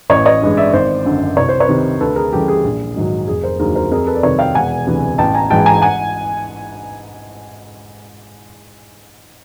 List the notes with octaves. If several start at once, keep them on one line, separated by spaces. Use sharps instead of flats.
A1 C#5 D#5
C#5 D#5
G2 E3 G#3
D5 E5
G#1 C5 D5
F#2 D3
C2 C#5
C5
B4 C#5
C3 D#3
D2 A4 B4
G#4 A#4
C#3 E3 G3 G4 A4
G#4
A#1
G#2 D#3 F#3
F1 G#4
A#4 C5
D#2 D3 F#3 G#4 A#4
A#4 C5
F2 G#4 A#4
A4 B4
D5
C3 D#3 G3 B4 C#5
F5 G5
E1 F#5 G#5
D2 C3 E3
A1 G5 A5
G#5 A#5
G#2 E3 G#3 G5 A5
G#5 A#5
F#5 G#5